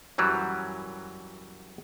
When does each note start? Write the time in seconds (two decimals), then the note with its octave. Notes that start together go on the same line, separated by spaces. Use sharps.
0.18 F#2 E3 F#3 G3